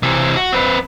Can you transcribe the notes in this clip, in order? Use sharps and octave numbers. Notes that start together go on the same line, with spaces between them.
C3 E3
F#4
C4 B4